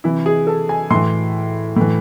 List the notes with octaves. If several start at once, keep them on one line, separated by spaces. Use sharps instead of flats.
C3 E3 E4
G#4
A4
G#5
A2 E3 C6
A2 E3